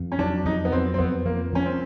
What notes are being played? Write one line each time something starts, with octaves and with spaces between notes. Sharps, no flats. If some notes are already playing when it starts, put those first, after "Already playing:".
Already playing: F2
C#4
F#3 D4
F2 D#4
B3
F#3 C4
C4
F2 B3
F3 A#3
F3 C#4
C4